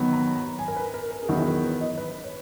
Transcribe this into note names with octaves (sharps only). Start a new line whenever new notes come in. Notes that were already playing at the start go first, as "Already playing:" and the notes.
Already playing: D#3 F#3 B3
A#5
A#5
G#5
A#4
B4
A#4
A#4
G#4
E2 D#3 F#3 B3 E4 F#4
A#4
B4
D#5
B4
B4
C#5